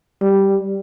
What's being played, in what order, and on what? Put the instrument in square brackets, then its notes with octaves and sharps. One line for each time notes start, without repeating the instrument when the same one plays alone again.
[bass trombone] G3